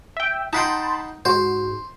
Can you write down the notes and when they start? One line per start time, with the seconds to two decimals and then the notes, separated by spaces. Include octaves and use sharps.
0.17 E5 G5
0.53 D#4 F#5 G5 A5 B5 C6
1.25 G#2 F#4 C5